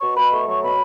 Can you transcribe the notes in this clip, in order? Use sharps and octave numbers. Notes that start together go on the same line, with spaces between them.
B2 C#6
B2 B5
A3 C#6
F#3 C#6
B2 B5